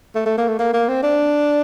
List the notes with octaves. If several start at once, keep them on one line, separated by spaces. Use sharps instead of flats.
A3
A3
A#3
A3
A#3
A#3
C4
D4